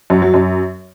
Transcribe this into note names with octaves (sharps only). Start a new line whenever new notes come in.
F#2
F#3
F#2